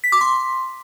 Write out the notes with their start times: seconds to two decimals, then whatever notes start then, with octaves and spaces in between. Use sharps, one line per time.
0.04 B6
0.12 D6
0.21 C6